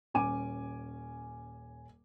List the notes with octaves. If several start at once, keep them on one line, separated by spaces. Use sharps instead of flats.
D#1 C#4 G#5 D6 D#7